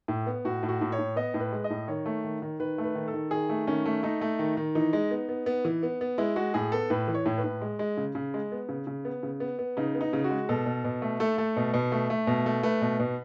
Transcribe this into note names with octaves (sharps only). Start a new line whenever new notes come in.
A2
B3
A2 F#4
A2
F#4
A2
C#5
A2
B3 D#5
A2
B4
G#3
D#5
A2
D#3 C#5
A3
D#3
D#3
D#3 B4
A3
B4
D#3
A4
D#3
D#3 G#4
A3
D#3 C#4
A3
A3 D#4
A3
D#3
D#3
E3 D#4
G#3
B3
B3
B3
E3
B3
B3
G#3 E4
G#3 F#4
A2 G#4
B3 A4
A2 B4
E3
C#5
A2
B4
A2
G#3
G#3
C#3
C#3
G#3
B3
C#3
C#3
B3
C#3
B3
B3
C#3 D#4
B3
D#4
C#3
F#4
G#3
B2 A4
B2
B2
A3
A3 A4
A3
B2
B2
A3
A3
B2
A3
A3 B4
B2
B2